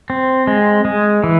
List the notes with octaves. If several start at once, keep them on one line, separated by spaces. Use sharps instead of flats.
C4
G#3
G#3
E3